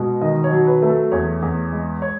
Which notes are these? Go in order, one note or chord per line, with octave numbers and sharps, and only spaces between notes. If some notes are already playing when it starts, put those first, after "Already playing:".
Already playing: B2 G#3
D#3 D#5
C#5
F#3
B4
A3
A4
E2 C#5
E2
G#3
C#5